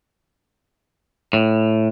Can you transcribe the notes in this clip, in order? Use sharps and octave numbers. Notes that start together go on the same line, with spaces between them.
A2